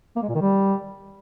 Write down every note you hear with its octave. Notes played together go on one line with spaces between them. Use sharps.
A#3
G#3
A#2
D#3
G3